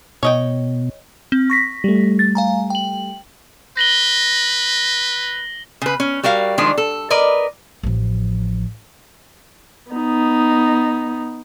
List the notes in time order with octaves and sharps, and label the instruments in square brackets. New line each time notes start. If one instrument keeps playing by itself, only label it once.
[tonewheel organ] B2 [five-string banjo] C#5 D#5 G5
[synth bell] C4
C#6 A#6 B6
[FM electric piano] G3 A3
[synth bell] A6
F5 G#5 A#5
G5 F#7
[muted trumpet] B4 [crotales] A#6 F#7 G7
[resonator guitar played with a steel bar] C#3 B4
C#4
G3 F#4 A#4 F5
D#3 F3 G#3 D4
A4
A#4 B4 D5 D#5
[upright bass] A1 F3
[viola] B3 D#4